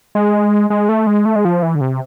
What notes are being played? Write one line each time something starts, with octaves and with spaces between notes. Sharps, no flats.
G#3
G#3
A3
G#3
A3
G#3
F3
E3
D3
C3